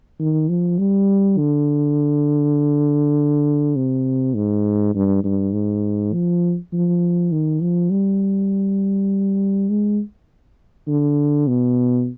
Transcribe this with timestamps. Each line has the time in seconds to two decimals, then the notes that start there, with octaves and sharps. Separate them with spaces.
0.20 D#3
0.49 F3
0.79 G3
1.38 D3
3.76 C3
4.35 G#2
4.95 G2
5.24 G2
5.53 G#2
6.13 F3
6.73 F3
7.32 D#3
7.62 F3
7.90 G3
9.69 G#3
10.88 D3
11.47 B2